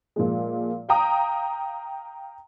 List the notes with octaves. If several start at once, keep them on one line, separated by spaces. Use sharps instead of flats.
A#2 F3 G#3
F5 G5 A#5 D#6